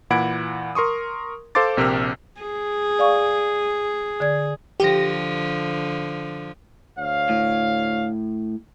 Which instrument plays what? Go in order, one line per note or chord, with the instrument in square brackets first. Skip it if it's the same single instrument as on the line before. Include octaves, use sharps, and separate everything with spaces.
[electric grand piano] A#2 E3 F#5 B5 G#6 D7
A#4 C6 C#6 D#6
A4 C5 F5 C6 D6 A6
A#1 C3 G4 A#4 E6 F6
[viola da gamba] G#4
[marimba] D5 F5 C#6
D3 D5 G#6
[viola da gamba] D3 F3 [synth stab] G4 A#6
[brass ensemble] D2 C#5 F5
[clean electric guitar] A2